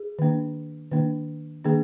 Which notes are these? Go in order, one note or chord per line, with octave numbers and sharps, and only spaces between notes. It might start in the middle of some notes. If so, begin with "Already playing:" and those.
Already playing: G#4
D#3 A#3 D4
D#3 A#3 D4
D#3 A#3 D4 G#4